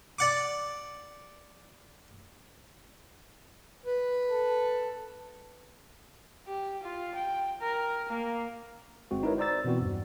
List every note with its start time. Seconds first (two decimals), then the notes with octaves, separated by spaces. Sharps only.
0.19 D5 F#5 D6
3.86 B4
4.30 A4
6.47 G4
6.83 F4
7.15 G5
7.61 A#4
8.09 A#3
9.11 G1 G#3 C4 F#4
9.23 D#4 E4 A#4 B4 C#5
9.38 C5 D5 A#5 E6 A6
9.64 B2 E3 B3 C4 F#4
9.81 E2 G2